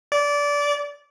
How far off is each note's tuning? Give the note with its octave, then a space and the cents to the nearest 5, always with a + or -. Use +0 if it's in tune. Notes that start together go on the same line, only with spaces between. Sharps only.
D5 -20